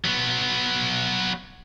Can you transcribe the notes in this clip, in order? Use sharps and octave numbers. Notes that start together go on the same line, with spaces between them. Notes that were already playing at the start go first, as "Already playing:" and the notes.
F#3 B3